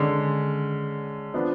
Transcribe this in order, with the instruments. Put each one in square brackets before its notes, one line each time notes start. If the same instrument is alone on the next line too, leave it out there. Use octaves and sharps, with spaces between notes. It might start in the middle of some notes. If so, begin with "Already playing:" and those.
Already playing: [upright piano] D3 G#3 C#4
F3 B3 D4